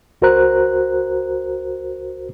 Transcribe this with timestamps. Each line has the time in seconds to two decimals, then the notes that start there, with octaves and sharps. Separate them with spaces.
0.22 C#2 F#4 A#4 C5 A#5 F#6